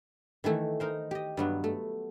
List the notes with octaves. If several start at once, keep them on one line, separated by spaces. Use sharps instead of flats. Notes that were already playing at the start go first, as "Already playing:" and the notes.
D#3 E3 A3 E4
D#4 A#4 C5
G4 D#5
G2 F#3 B3
A3